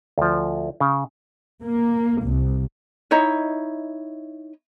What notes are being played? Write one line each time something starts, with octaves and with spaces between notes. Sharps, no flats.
D2 F3
C#3
A#3
C2
D#4 E4 C#5 D#5